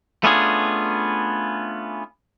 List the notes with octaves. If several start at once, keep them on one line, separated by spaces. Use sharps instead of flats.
A3 B3 C#4 D4 F4 G#4